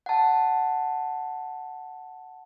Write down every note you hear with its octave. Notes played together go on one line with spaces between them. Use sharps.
F#5 A5